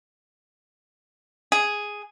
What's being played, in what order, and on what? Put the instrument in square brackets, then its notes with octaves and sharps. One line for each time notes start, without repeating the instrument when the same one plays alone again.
[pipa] G#4